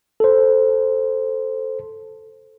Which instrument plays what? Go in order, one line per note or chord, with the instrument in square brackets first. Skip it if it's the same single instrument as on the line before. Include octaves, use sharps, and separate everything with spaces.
[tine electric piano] A4 C5